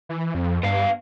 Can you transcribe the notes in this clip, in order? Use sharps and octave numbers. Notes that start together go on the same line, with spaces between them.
E3
F2
G2 B3 F5